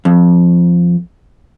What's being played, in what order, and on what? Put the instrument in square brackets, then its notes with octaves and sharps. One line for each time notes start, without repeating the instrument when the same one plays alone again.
[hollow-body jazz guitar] F2